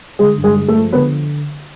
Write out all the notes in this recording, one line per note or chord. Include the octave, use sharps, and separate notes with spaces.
D3 G#3 G#4
G2
G#3 G#4
G#3
A3 A4
F3
D3 B3 B4